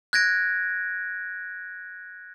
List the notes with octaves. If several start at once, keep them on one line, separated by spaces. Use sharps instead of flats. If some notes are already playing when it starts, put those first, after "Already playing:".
F#6 G#6 A#6 D7